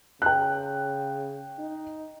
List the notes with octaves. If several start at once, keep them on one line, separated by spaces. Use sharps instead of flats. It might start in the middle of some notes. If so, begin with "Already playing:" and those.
C#3 G5 F#6
D#4